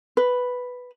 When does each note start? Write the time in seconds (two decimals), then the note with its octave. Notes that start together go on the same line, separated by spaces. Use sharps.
0.17 B4